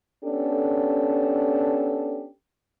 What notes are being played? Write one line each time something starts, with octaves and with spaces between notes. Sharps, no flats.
B3 C#4 D4 G4 A4